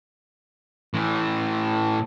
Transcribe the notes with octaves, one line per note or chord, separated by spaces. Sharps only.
A2 E3